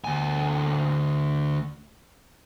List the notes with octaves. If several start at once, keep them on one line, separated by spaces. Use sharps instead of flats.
D2 G#5